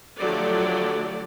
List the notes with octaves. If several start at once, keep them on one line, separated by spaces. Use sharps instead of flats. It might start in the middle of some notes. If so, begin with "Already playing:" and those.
D3 F3 F#3 A3 G4 D5